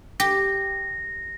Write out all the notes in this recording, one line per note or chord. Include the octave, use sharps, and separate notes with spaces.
G4 A#6